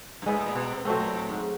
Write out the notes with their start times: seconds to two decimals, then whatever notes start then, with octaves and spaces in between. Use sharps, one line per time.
0.22 G2
0.26 G#2 G#3 B3 E4
0.36 A2
0.46 A#2
0.55 B2
0.71 C3
0.85 C3 F#3 A3 C4
1.00 A#2
1.15 A2
1.29 G#2